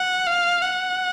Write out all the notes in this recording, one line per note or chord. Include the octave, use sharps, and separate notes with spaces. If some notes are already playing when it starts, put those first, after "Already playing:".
Already playing: F#5
F5
F#5